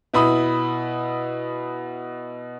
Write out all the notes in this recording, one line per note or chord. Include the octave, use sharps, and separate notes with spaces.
B2 E4 B5 D#6